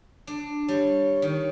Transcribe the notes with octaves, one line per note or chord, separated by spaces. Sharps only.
D4
G3 C#5
D#3